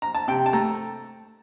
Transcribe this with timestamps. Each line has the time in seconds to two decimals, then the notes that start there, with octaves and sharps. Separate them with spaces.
0.02 A#5
0.15 A5
0.28 C3 G5
0.46 A5
0.53 A3 A#5